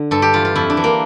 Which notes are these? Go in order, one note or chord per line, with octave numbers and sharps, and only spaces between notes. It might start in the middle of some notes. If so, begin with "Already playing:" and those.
Already playing: D3
G2 A4
G4
E3 F4
F4
F2 E4
D4
E3
A#3